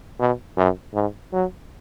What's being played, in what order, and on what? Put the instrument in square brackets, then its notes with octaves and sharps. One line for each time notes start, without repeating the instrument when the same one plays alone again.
[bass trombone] B2
F#2
G#2
F#3